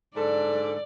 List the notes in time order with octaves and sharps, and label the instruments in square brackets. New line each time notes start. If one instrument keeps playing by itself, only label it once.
[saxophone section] G#2 D3 A4 [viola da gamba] D5